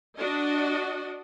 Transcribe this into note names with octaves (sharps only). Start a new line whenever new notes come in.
D4 F#4 D#5